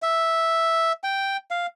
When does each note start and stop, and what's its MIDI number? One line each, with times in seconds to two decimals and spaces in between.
0.02 0.92 76
1.04 1.37 79
1.51 1.66 77